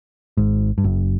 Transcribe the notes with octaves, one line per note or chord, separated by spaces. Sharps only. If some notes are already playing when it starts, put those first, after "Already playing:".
G#1 G#2
G2
F#1 F#2